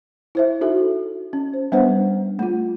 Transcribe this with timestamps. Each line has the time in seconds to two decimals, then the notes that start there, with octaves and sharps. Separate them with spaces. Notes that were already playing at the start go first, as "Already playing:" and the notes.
0.35 E4 C5 E5
0.61 D#4 F#4 A4 E5
1.33 C#4
1.53 C5
1.72 G3 B3 D4 B4 C5 F#5
2.39 A3 F4